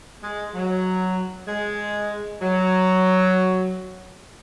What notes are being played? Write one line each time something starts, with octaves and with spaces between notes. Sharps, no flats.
G#3
F#3
G#3
F#3